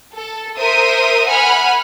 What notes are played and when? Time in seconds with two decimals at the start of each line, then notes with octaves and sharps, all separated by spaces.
0.15 A4
0.57 A#4 C5 E5 D#6
1.27 F#5 G#5 B5 F6